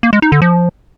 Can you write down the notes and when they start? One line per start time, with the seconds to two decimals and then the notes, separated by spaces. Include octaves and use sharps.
0.03 A#3
0.13 G#3
0.22 D#4
0.32 D3
0.42 F3